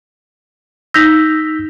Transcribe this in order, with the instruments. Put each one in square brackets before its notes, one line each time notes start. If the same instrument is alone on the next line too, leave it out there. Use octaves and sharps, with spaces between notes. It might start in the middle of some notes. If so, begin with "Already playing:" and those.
[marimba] D#4 A#6 [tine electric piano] E6 G6 B6